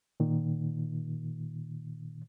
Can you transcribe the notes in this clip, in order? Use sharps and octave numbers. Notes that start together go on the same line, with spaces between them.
A#2 D#3